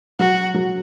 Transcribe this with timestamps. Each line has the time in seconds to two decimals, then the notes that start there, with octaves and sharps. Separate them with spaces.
0.19 F#3 F#4
0.54 F#3